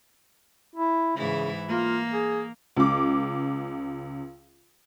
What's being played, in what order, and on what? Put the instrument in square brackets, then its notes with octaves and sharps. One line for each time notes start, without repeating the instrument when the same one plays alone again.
[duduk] E4
[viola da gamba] G#2 E3 E4 [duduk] C#3
[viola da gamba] A#3 [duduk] F4
[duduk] G#4
[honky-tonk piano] C#2 D6